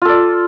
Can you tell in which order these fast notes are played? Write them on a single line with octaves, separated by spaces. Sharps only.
F4 A4 D5